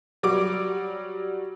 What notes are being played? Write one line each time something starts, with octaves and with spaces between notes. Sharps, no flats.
F#3 G3 D6 D7